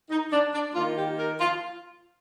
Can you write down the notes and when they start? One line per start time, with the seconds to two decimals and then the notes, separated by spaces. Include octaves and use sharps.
0.10 D#4
0.32 D4
0.54 D4
0.75 D#3 A#3 F4
0.97 G4
1.18 A#4
1.40 F4